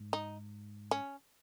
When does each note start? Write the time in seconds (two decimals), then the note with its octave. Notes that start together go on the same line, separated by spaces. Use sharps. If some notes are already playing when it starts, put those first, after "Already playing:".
Already playing: G#2
0.13 D#4
0.91 C#4